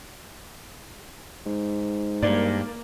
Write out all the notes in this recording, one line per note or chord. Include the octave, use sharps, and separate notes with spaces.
G#2
G2 A#3 D5